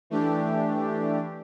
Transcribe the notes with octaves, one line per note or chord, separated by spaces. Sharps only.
E3 A3 D4 G4